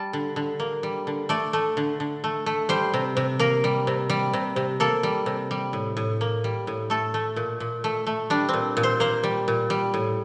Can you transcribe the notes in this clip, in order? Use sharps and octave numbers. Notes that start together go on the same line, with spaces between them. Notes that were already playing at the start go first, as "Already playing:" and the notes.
Already playing: G3 A5
D3
D3
A#3
G3
D3
A3 D5
A3
D3
D3
A3
A3
G3 C5
C3
C3
A#3 A#4
G3
C3
G3
C3
C3
A#3 A4
G3
C3
G3
A2
A2
A#3
G3
A2
A3 A4
A3
A#2
A#2
A3
A3
G3 D4
A#2 C4
A#2
C5
A#3 C5
G3
A#2
G3
A2